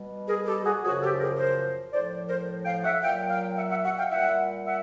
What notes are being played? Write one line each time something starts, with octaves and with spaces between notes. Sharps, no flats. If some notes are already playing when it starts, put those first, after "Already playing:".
Already playing: B2 G3
G#4 A#4
G4 A4
F#4 G#4
F#2 C#3 F3 F#4 G#4
G4 A4
G#4 A#4
A#4 C5
A2 F3 C5 D5
A#4 C5
F5 G5
E5 F#5
A#2 F#3 F5 G5
F5 G5
E5 F#5
E5 F#5
E5 F#5
F5 G5
A#2 G3 E5 F#5
E5 F#5